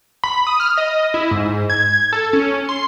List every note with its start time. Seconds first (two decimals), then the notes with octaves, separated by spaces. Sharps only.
0.24 B5
0.47 D#6
0.60 F6
0.77 D#5
1.14 E4
1.31 G#2
1.70 G#6
2.13 A4
2.33 C#4
2.69 C6